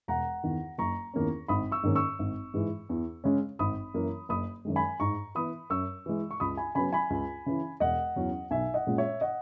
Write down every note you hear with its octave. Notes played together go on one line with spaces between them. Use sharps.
E1 F#5 A#5
E2 D#3
F#1 A#5 C#6
E2 D#3 A#3 C#4
G#1 B5 D#6
C#6 E6
G#2 D#3 A#3 C#4
C#6 E6
G#1
G#2 E3 G#3
E2
C#3 G#3 C#4
G#1 B5 D#6
F#2 E3 A#3
F#1 B5 D#6
F#2 D#3 G#3
G#5 B5
G#2 A#5 C#6
E3 B3 B5 D#6
F#2 C#6 E6
E3 G#3
C#6
C#2 B5 D#6
G#5 B5
C#3 F#3 B3 G#5 B5
G#5 B5
C#2
C#3 E3
E1 D#5 F#5
E2 C#3 F#3 C#4
B1 E5 G#5
D#5 F#5
A#2 G#3 C#4
C#5 E5
D#5 F#5